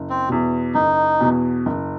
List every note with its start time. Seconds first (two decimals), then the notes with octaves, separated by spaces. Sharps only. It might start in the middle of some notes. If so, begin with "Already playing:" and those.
Already playing: F#1
0.10 C4
0.29 E2 B2
0.74 F#1 D#4
1.21 E2 B2
1.66 F#1